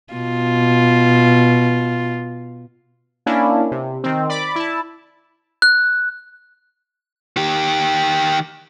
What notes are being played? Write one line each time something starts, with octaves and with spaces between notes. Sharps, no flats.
B2 F4
A#3 C#4 D4 E4
C3
D#3 C4
D5 B5 D6
E4 A5
F#6
D#3 G4